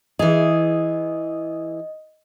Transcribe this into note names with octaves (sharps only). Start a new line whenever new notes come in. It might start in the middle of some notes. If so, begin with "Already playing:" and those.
E3 G#4 D#5